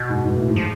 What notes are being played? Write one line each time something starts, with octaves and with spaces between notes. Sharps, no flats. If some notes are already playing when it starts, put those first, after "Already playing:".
Already playing: B2
G#2
G#2
A2
G#2
F3